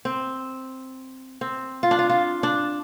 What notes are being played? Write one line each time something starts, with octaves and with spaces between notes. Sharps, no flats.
C4
C4
F4
D4
F4
F4
D4